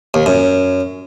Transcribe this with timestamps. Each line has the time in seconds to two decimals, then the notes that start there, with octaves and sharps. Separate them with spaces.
0.14 D#2
0.26 F#2